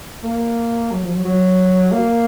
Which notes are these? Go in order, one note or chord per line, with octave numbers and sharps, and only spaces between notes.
A#3
F#3
F3
F#3
F#3
A#3